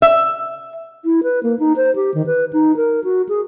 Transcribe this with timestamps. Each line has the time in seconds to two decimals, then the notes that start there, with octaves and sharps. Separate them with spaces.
0.02 E5
1.03 E4
1.23 B4
1.43 A#3
1.59 D#4
1.76 C5
1.96 G4
2.14 D#3
2.26 B4
2.53 D#4
2.77 A#4
3.04 F#4
3.29 G#4